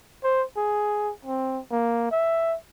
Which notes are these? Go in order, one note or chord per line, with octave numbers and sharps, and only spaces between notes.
C5
G#4
C4
A#3
E5